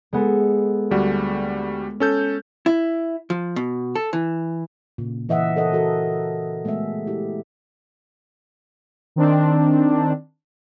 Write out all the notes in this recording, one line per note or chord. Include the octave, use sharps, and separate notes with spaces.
G#3 B3 A4
D2 G3 F#4
C#4 A4 G6
E4
F3
B2
A4
E3
A#2 C#3
E3 D#5 E5 F#5
A4 A#4 C5 D#5 F#5
E3 F#4 A4 A#4
G#3 A3 B3 G#4 E5
E4 G4
D#3 C4 D4